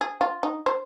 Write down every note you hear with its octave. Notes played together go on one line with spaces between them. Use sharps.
G#4
F4
D#4
C5